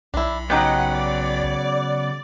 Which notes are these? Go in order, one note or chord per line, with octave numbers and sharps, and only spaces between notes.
B1 D4 E4
C#3 F#3 B3 D#4 G4 D#5 F#5 G5
D5